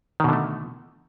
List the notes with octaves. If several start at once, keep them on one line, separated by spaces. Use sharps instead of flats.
B2 D3 D#3 A3